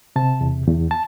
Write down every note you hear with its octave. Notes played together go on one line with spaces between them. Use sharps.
C3 A5
E2
E2
A5